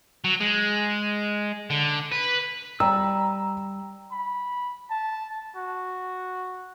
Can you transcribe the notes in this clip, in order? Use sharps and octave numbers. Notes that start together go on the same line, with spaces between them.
F#3
G#3
D3
B4
G3 A#5 E6
B5
A5
F#4